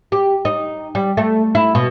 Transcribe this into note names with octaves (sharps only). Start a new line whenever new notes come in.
G4
D#4
G3
A3
E4
B2